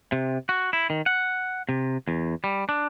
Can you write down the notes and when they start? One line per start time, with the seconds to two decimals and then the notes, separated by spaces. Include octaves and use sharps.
0.12 C3
0.49 F#4
0.73 E4
0.90 D#3
1.06 F#5
1.69 C3
2.08 E2
2.44 G3
2.69 D4